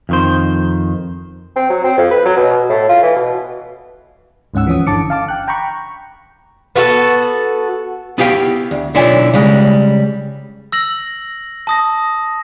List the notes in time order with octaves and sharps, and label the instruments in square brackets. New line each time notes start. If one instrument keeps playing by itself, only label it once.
[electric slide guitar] F2 D#3 C5
[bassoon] C4
F#3
C4
F2
B4
F#3
B2
B2
A2
F4
E3
B2
[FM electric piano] D2 G#2 C#4 F#5 E6
E3 F3 C#4 D#6
G1 D3 A5 D6 C#7
F5 A5 D6
G5 F#6
G5 A#5 B5 C#6
[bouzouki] B3 F#4 A4
[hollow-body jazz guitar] B3 E4 G4 F5 G5
D2
B1 D3 E4 F4 C#5 G#5
C#3 G3 G#3
[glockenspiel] E6 A#6 F#7
A5 D#6 A#6